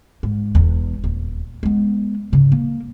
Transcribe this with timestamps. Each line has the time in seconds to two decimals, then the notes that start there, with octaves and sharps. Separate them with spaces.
0.23 G#2
0.55 E1 E2
1.04 D#1
1.63 G#3 B3
2.32 G#2 C#3
2.52 A#3